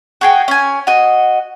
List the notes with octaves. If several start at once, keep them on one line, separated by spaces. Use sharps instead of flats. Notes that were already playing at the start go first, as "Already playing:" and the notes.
F#4 G#4 G5
C#4 G#5
F#4 D#5